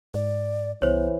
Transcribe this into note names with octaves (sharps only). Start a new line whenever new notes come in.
G#2 D5
C2 E3 B3 C5 C#5